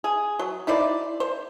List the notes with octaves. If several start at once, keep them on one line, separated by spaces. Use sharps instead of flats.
G#4
F#3
D#4 E4 C5 D5
C5